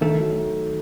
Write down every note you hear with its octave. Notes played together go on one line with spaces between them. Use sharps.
D#3 A3
F#3